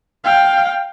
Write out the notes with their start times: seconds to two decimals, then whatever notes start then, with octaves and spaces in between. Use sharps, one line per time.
0.25 F5 G5